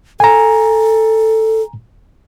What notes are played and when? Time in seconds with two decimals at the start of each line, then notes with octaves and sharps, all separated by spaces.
0.20 A4 G#5 A#5